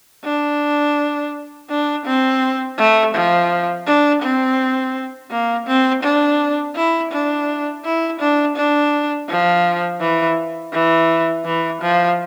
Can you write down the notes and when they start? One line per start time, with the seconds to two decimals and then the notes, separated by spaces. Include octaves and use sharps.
0.25 D4
1.70 D4
2.06 C4
2.78 A3
3.15 F3
3.87 D4
4.23 C4
5.31 A#3
5.67 C4
6.03 D4
6.76 E4
7.12 D4
7.85 E4
8.20 D4
8.56 D4
9.29 F3
10.00 E3
10.73 E3
11.45 E3
11.82 F3